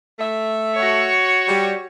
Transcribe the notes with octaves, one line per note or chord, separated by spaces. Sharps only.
A3 E5
F#4 C#5
G3